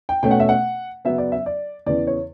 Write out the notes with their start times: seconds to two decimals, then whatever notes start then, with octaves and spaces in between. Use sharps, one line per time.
0.09 G5
0.23 B2 A3 C#4 G5
0.31 F#5
0.40 E5
0.49 F#5
1.05 F#2 C#3 F#3 B3 E5
1.18 D5
1.32 E5
1.46 D5
1.86 E2 C#3 E3 D5
2.07 C#5